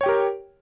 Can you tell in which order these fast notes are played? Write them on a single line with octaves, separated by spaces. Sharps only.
C#5 G5 G4 A#4